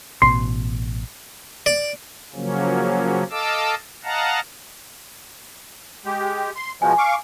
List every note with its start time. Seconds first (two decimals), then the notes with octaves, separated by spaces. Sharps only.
0.22 A1 B2 C6
1.66 D5
2.34 C#3 F3 F#3 A#3 C#4
3.31 A4 D#5 F5 A5 D6 E6
4.04 D#5 F5 F#5 A5 A#5
6.05 G#3 G4
6.56 C6
6.82 B2 F3 G#3 G#5
6.98 F5 C#6 D6